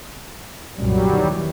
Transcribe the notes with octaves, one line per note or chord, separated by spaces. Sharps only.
C2 F#2 A#2 F#3 G3
D#2 D#3 E3